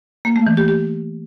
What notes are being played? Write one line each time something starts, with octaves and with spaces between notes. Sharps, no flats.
A#3
A3
E3
G4
G4